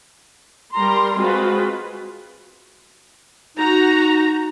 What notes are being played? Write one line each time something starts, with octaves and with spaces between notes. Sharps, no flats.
G3 A#4 A#5 C6
G#3 C4 F4 F#4 B4
D#4 F#4 A#5